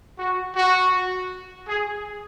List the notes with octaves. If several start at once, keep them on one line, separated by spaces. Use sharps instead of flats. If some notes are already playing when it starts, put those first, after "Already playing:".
F#4
F#4
G#4